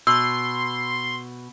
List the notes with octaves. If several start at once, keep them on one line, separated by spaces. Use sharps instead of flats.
B2 C6 E6